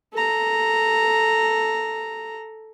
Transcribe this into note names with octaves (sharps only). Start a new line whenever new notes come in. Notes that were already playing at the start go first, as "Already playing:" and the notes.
A4 A#5